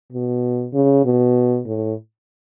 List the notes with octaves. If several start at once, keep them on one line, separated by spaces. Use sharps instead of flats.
B2
C#3
B2
A2